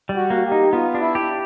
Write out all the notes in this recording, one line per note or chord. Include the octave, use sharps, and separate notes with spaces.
G3
F#4
A#3
G4
D#4
B3 F4
D4
E4
G4